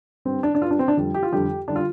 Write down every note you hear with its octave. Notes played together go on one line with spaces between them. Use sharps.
G2 G3 C4
D4
D4
G2 G3 D4 F4
C4
D4
F2 D3 G3
G4
F4
F2 D3 G3 G4
D3 G3 D4
F4